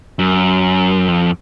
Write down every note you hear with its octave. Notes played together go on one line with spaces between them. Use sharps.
F#2
F2